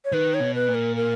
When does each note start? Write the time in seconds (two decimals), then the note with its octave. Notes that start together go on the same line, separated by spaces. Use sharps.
0.05 C#5
0.12 D#3 B4
0.34 C#5
0.40 B2
0.55 B4
0.68 A#2
0.74 A#4
0.96 A#4